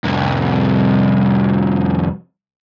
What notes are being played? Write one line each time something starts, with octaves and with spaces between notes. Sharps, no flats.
C2 F2